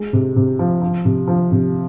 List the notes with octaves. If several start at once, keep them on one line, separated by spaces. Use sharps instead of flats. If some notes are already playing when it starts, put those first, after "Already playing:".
Already playing: G#3
C3
C3
F3
F3
C3
F3
C3